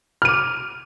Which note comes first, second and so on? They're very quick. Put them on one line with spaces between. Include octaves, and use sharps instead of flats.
F6 D#7 D6